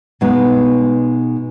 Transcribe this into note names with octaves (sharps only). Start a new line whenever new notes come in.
B2 G#3 B3 D#4